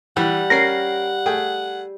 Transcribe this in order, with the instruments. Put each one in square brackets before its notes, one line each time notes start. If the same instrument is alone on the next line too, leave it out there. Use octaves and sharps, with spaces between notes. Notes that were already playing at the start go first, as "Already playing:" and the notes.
[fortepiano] E3 [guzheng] G3 [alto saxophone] F#5
[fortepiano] C#4 A#4 [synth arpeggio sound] A#6 C7
[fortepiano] A3 G#4 G5